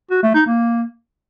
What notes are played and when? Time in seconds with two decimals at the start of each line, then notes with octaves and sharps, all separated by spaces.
0.11 F#4
0.23 A3
0.35 D#4
0.47 A#3